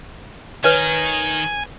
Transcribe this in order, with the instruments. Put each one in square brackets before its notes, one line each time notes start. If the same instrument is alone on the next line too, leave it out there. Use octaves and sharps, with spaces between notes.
[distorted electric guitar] D#3 [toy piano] B4 C#5 [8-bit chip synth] G#5